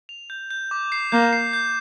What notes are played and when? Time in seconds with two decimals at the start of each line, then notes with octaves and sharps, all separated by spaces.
0.09 F7
0.30 G6
0.51 G6
0.71 D6
0.92 C7
1.12 A#3 G6
1.33 C7
1.53 G6